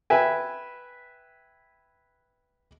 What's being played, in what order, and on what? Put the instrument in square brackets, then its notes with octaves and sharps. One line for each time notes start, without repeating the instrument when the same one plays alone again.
[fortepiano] B4 E5 G5 G#5